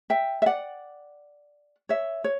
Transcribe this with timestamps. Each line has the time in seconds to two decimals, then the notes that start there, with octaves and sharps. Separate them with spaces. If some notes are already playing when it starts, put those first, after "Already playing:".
0.10 E5 G5
0.42 E5
0.46 D5 F#5
1.89 C#5 E5
2.24 C#5